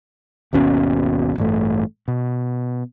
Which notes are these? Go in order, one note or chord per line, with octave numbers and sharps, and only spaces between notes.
G#1 D#2 B2 C#4
A1 G2 A3
B2